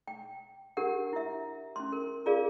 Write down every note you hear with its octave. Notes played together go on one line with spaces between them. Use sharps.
G5
D4 G4 A#4 F#5
E4 E5
C#4 C6
A#4
F4 G#4 A#4 D5 F5